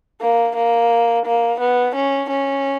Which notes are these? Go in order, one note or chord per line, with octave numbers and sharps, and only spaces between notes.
A#3
A#3
A#3
B3
C#4
C#4